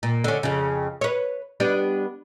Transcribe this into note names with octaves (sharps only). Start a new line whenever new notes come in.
A#2
D3 C#4
F2 C#3
B4 C#5
G3 B3 D4